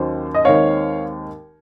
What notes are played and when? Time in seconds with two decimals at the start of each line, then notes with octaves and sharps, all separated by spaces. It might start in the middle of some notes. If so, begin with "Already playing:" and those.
Already playing: D#2 D#3 F#3 C#4 C5
0.35 D#5
0.45 D#2 D#3 G#3 C4 C#5 F5